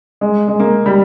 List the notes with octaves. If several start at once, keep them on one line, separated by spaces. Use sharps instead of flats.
G#3
G#3
A#3
G3